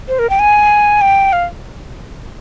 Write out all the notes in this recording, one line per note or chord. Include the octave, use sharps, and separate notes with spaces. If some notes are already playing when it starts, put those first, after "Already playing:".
C5
A#4
G5
G#5
G5
F5